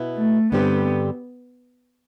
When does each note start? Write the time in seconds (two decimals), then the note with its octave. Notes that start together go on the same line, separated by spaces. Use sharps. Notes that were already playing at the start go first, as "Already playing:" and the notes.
Already playing: B2 B3 E4
0.16 A3
0.52 G2 D3 G3 B3 C4 G4